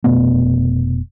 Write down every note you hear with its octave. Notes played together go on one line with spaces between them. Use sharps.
F1 B2 A3 B3